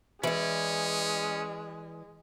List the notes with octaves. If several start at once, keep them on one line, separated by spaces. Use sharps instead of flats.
E3 G#3 C#4 D5